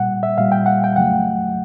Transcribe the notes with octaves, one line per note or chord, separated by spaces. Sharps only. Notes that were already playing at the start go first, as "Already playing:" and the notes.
Already playing: A#2 G3 F#5
E5
A#2 G3 F5
G5
F#5
G5
F2 C#3 F#3 A3 F#5